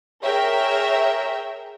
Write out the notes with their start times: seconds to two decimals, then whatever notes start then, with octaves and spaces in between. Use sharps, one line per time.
0.23 G#4 A#4 C#5 E5 G5